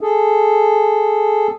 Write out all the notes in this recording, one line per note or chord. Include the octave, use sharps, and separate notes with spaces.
G#4 A4